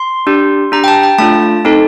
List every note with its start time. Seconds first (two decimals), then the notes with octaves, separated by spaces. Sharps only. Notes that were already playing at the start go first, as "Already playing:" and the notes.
Already playing: C6
0.27 D4 G4
0.72 D4 G4 A#5
0.84 G5
0.88 A5
1.03 G5
1.18 A3 D4 F4 A5
1.65 C4 D#4 A4